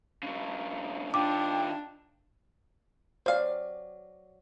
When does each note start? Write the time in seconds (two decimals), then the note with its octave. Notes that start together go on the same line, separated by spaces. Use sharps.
0.23 G2 C#3
1.14 D#3 D4 F4 G5 D6
3.26 F#3 C5 D5 F5